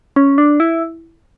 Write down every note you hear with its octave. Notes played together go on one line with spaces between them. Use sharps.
C#4
D4
E4